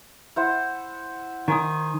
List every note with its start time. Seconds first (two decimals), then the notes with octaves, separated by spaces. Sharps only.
0.36 E4 C5 F#5
1.48 D#3 G#5 C6 D#6